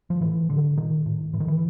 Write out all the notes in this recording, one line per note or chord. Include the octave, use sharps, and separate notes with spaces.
F3
A2 E3
A2 D3
A#2 D#3
A2
A2 E3
D#3
E3